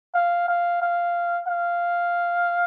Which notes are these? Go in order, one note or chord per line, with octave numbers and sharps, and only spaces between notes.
F5
F5
F5
F5